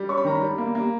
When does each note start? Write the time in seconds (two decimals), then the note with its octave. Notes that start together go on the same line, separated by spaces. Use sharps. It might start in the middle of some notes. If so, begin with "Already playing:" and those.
Already playing: G3
0.09 C#4 C#6
0.17 B5
0.25 D#3 A#5
0.35 B5
0.41 G3
0.58 A#3
0.75 A#3